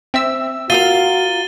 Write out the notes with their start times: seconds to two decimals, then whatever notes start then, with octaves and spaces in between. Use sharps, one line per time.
0.14 C4 E5 E6
0.70 F4 F#4 G#4 A#4 A6 D#7 G7